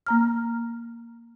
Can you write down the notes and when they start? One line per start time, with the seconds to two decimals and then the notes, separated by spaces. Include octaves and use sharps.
0.06 A#3 A#5 F6